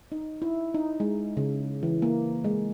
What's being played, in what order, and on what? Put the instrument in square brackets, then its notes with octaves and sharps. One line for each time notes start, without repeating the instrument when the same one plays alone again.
[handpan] D#4
E4
D#4
G#3
C#3
E3
A#3
G#3